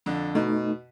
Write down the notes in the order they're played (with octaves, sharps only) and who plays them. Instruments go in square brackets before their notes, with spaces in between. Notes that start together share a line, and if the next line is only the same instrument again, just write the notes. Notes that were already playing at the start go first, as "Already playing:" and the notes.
[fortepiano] F2 D3
[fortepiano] B2 [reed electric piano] A3 D#4